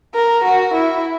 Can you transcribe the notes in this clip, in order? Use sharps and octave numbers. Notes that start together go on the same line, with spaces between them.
A#4
F#4
E4